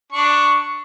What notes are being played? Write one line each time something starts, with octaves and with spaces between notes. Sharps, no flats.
D4 C#6